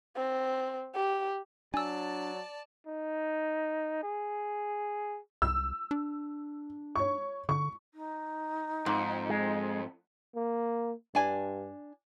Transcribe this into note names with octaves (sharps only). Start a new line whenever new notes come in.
C4
G4
F#3 D4 D5 G#5 A5 E6
D#4
G#4
C2 E6
D4
C#5 C#6
D3 C#6
D#4
F2 G#2
G#3
A#3
G2 D4 G#5